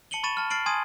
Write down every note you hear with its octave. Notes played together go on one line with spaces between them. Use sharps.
A5 C#7 D#7 F#7 G7
B5 C#6 A6 D#7 E7
A5 F6
F6 A6 C7 D7 F#7
G#5 A5 C6 D#6 G#6 D#7